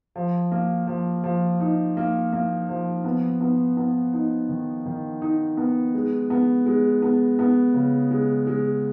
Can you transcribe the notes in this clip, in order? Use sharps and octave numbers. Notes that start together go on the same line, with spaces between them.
F3
A#3
F3
F3
D#4
A#3
A#3
F3
B3
B3
B3
D#4
D#3
D#3
D#4
B3
G#3
B3
G#3
B3
B3
C#3
G#3
G#3